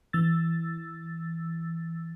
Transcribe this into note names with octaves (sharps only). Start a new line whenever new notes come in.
E3 E6 A6